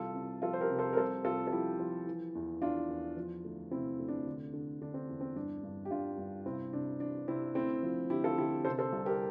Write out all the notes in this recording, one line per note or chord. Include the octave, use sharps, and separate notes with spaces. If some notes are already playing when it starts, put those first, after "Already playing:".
Already playing: C2 E3 F4 A4
C3
F3 F4 A4
C5
G4 A#4
C3
A4 C5
A#4
C2 A4 C5
C2 F4 A4
A4
F3 E4 G4
F3
E3
E2
E2 D4 F4
E2
F3
D2
C3 C4 E4
D2
D4
D3
D3
D3 D4
C4
E2
C4
G2 D4
G2
G4
G2 D4 F4
G2
C3 C4 E4
C3 D4
E3 D4
C3 C4 E4
D2 C4 E4
F3
D3 E4 G4
F4 A4
D3 E4 G4
C3 A4 C5
A4 C5
C2
G4 A#4